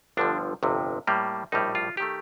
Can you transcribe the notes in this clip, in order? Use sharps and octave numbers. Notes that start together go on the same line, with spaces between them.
G1 G2 D3 F3 D4
G1 F2 C3
A2 G3 A#3
A#1 A2 G3 D#4
F4
D#3 A3 G4